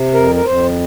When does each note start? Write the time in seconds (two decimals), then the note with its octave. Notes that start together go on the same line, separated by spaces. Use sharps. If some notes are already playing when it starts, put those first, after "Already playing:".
Already playing: C3
0.14 F2 A#4
0.35 A#4
0.45 F2 C5